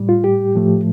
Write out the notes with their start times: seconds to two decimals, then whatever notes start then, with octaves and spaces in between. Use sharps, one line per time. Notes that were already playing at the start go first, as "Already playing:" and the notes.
Already playing: A2 G3
0.09 F4
0.24 G4
0.55 A2 F3 A3